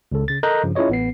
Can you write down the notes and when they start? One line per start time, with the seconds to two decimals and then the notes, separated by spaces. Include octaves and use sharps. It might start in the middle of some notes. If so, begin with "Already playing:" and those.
0.12 C#2 C#3 A4
0.28 C#3 A6
0.43 A4 A#4 D#5 A#5 F#6 G6
0.64 G2 C#3 F3
0.76 C#4 E4 F4 G#4 C#5 D#5
0.89 A1 B3 C7